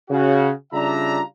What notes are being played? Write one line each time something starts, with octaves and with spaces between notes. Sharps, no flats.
C#3 F#4
C#3 G3 D4 F4 E5 A#5